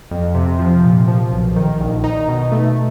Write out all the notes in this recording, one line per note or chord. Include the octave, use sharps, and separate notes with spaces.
F2
C3
F3
A#2
F3
B1
D#3
A#1
D#4
B2
A3